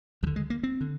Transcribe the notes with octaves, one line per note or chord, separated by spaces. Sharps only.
D#2 D3 F3
G#3
A#3
C4
D3